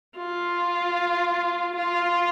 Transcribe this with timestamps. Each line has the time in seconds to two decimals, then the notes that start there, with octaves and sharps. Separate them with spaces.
0.18 F4
1.76 F4